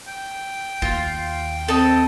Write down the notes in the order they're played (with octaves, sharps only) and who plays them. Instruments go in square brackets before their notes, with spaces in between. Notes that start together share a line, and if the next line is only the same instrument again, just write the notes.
[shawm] G5
[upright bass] D#2 [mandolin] F4
[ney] C4 [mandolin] A4 D#5